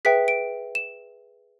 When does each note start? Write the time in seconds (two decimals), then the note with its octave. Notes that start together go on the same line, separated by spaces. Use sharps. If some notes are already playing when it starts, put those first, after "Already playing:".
0.05 G#4 B4 E5 G5 B6
0.28 D7
0.75 E7